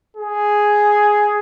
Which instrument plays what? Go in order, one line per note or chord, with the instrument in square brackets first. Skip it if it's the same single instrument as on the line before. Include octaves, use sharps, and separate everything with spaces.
[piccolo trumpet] G#4